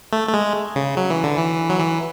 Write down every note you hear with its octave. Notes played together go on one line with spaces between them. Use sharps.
A3
A3
G#3
C#3
F#3
E3
D3
E3
F#3
E3